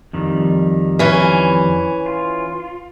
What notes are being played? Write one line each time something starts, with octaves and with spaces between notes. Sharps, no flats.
F2 D#3 G3
E3 C#4
F4